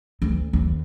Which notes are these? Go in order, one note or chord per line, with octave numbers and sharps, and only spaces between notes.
D2
D#2